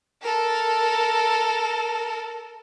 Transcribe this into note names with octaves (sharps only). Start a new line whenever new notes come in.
A4 A#4